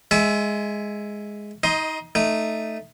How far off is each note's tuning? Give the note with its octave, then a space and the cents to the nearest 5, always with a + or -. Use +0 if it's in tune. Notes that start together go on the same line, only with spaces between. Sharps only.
G#3 +0 E5 +0 G#5 +40
D#4 +25 D#5 +0 C6 +0
A3 +0 D#4 -5